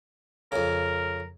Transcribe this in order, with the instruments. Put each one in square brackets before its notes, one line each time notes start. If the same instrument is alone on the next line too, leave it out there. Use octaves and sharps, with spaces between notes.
[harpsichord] F2 C#3 [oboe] A#4